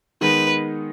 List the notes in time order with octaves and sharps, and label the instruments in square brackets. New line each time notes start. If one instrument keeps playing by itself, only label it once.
[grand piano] D#3 G#3 B3 D#4 [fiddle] B4